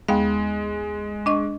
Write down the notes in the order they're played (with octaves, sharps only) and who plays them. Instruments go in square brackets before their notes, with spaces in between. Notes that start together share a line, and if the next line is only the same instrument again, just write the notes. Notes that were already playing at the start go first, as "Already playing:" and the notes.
[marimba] D#2 B3 F5 [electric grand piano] G#3
[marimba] D4 D#5 C#6